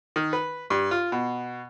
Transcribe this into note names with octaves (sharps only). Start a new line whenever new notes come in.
D#3
B4
G2
F4
B2